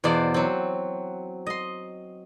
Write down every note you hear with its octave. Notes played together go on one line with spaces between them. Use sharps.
E2 B2 C5 D5 F5
F#3 C4
D#5 C6